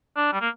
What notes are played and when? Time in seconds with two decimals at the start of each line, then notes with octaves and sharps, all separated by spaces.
0.17 D4
0.33 G3
0.41 A#3